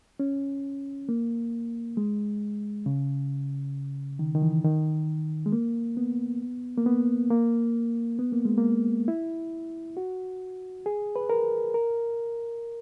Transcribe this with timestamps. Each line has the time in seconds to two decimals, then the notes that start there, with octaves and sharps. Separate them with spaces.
0.20 C#4
1.09 A#3
1.97 G#3
2.86 C#3
4.19 D#3
4.34 D#3
4.42 E3
4.64 D#3
5.46 G#3
5.52 A#3
5.97 B3
6.77 A#3
6.86 B3
7.31 A#3
8.19 B3
8.32 A#3
8.45 G#3
8.58 A#3
9.08 E4
9.97 F#4
10.86 G#4
11.16 B4
11.30 A#4
11.74 A#4